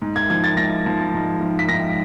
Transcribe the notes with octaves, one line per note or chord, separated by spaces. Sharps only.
G#2
G#6
F3 G#6
A6
G#2 A#6
F3
G#2
F3
B6
G#2 A#6